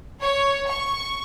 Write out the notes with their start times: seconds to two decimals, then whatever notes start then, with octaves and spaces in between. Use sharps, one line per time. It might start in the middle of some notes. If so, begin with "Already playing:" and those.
0.22 C#5
0.70 C#6